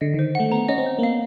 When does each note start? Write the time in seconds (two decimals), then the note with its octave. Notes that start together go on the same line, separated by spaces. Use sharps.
0.01 D3 D#5
0.14 D#3 C5
0.35 A3 F#5
0.52 B3 A#5
0.69 C#4 D#5
0.78 C4
0.86 C5
0.99 A#3
1.02 B3 F5